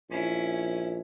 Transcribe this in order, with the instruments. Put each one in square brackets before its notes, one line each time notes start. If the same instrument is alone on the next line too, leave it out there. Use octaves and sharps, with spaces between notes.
[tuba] A#1 [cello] C#4 E4